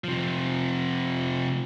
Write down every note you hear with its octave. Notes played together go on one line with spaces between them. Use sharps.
C3 F3